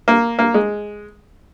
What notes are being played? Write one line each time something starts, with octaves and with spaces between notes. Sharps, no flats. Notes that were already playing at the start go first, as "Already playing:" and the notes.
A#3
A#3
G#3